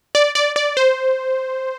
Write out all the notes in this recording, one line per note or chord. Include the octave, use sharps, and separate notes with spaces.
D5
D5
D5
C5